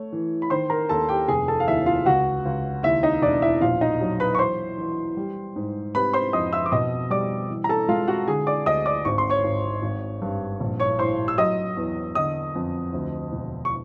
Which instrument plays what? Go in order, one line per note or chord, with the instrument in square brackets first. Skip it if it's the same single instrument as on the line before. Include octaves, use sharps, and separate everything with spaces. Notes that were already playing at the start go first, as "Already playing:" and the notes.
Already playing: [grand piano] A3 C#5
E3
B5
D#3 C5 C6
A#4 A#5
D#2 A4 A5
G4 G5
F1 G#4 G#5
A4 A5
F5
D#2 E4 E5
F4 F5
C#2 F#4 F#5
C#2
D#2 E4 E5
D#4 D#5
E1 D4 D5
E4 E5
A#1 F4 F5
D#4 D#5
F#3
B4 B5
C#6
E3 C5 C6
E3
G3
G#2
C3 B4 B5
C5 C6
F2 D#5 D#6
E5 E6
D6
B2 D#5 D#6
G3 D5 D6
E3
A#5
A4 A5
G#3 F4 F5
F#4 F#5
D3 G#4 G#5
D5 D6
D2 D#5 D#6
D5 D6
G#1 C#6
C6
C#5 C#6
G#1
G#1
G2
A#1
C#5 C#6
A2 C5 C6
E6
F#3 D#5 D#6
E2
D3 D#5 D#6
F2
D2
E1
C#6